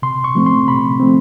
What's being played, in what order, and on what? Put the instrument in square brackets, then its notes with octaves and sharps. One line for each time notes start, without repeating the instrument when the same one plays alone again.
[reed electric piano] C3 C6
C#6
F3 A3 C4
C6
C3 B5
F3 A3 C4